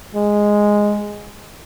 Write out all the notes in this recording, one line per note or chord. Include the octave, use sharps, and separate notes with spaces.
G#3